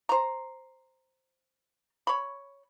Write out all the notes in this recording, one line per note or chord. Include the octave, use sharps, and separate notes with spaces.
C5 A#5
C#5 B5